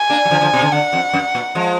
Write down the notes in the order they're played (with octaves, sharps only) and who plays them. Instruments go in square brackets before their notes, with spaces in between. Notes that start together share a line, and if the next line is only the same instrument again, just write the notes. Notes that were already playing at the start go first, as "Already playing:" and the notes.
Already playing: [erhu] G#5
[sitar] A#3 D4
F#3
D3 F3
D3 F3
B2
D3
[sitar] D3 [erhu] F#5
[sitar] F2
F#2
A#2
F3 G#3